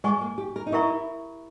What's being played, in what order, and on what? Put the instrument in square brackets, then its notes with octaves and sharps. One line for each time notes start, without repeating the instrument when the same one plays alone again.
[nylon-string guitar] G#3 [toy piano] G#4 D#5 G#5 C#6
[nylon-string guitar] A#3
G4
A#4
D#4
[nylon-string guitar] E4 [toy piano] G4 A#4 E5 A#5 C#6